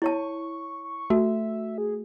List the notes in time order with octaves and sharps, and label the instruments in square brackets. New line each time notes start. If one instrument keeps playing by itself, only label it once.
[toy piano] E4 C#5 A5 [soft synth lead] C#6
[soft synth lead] C#6
[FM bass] A3 [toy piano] F#4 [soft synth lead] E5
[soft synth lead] G#4